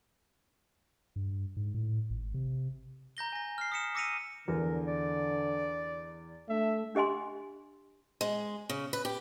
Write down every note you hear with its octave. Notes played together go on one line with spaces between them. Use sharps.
G2
G#2
A2
G#1
C3
A#5 G6 A#6 G7
G#5 A#6
F6 C7
D#6 B6 C#7 E7
D6 E6 A#6 C#7 D#7 F7
E2 D3 A#4
D5
A3 D4 E5
D4 G4 D#5 G#5 C6
G#3
C#3
B4
G4